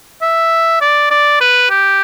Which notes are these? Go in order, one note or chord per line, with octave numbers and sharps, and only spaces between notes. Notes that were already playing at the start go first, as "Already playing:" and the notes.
E5
D5
D5
B4
G4